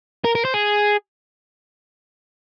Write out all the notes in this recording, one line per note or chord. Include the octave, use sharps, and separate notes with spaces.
A#4
A#4
C5
G#4